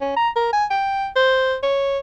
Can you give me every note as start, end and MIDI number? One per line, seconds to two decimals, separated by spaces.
0.01 0.15 61
0.16 0.29 82
0.36 0.48 70
0.53 0.65 80
0.70 1.07 79
1.16 1.55 72
1.63 1.99 73